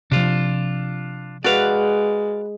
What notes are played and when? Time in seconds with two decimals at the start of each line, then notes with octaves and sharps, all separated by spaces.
0.12 C3 F3 D4 F4
1.44 G#3 F#4 B4 D5 F5